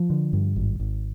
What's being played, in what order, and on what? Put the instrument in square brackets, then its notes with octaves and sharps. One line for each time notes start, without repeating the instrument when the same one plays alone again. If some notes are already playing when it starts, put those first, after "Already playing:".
Already playing: [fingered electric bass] F3
D3
G2
G#1
G#1